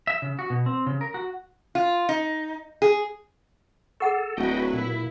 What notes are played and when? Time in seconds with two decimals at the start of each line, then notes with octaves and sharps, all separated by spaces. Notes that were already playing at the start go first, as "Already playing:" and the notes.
0.07 E5
0.22 C#3
0.39 F#4
0.50 B2
0.66 C4
0.87 C#3
1.01 A#4
1.14 F#4
1.75 F4
2.09 D#4
2.82 G#4
4.00 G#4 A4 F#5 C#6
4.37 D1 F#3 F#4 B4 D#5 G5
4.73 A#2 E4